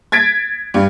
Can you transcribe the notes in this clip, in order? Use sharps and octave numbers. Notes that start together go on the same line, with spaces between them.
G#6 A6 B6 D7
G2